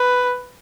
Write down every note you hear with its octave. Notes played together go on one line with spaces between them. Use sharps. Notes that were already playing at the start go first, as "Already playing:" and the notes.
Already playing: B4